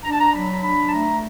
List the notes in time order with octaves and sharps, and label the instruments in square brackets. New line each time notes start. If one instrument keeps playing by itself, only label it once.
[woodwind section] D4 A#5
A5
A#5
F#3 B5
D4 B5
A5
A3 A#5